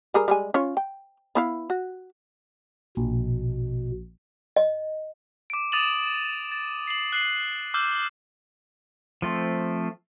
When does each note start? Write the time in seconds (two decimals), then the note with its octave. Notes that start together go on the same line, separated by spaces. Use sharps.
0.14 G3 G#4 A#4
0.28 G3 G#3 G#5
0.54 C#4 F4 C#5
0.77 G5
1.35 B3 E4 F5
1.70 F#4
2.97 A#1 B2
4.56 D#5
5.50 D6 D7
5.72 D6 D#6 A6 D#7 E7 F#7
6.52 A6
6.87 C7 F#7
7.13 F#6 C7 F#7
7.74 D6 E6 F6 G6
9.22 F3 A3 C4